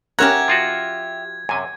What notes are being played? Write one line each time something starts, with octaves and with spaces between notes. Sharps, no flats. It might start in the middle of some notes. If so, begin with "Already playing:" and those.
C#4 G4 A#4 E5 F#5 A#5 G#6
F3 F4 F#4
F#2 C3 G#5